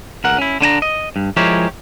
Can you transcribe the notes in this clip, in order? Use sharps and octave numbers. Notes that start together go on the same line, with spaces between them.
C#2 A#4 F#5
C#4 E4
D3 D4 G#5 A#5
D#5
G2
F3 G#3 E4 G4 A#4 C#5